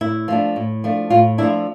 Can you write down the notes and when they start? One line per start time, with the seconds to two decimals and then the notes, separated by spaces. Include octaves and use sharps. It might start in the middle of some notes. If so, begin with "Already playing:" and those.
0.01 A2 E4
0.28 F3 A3 D4
0.56 A2
0.84 F3 A3 D4
1.10 A2 F4
1.38 F3 A3 D4 E4